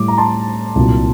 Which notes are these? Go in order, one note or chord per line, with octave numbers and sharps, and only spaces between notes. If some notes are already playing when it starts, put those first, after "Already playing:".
Already playing: A2 G3 D6
A#5
A5 C6
C2 A#2 F#3